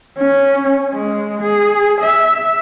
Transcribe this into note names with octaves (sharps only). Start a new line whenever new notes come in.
C#4
G#3
G#4
E5